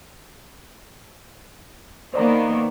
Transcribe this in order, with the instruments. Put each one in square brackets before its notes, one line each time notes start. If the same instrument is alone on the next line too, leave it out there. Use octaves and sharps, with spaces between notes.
[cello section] D#3 A#3 B3 [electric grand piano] C5 D5 A#5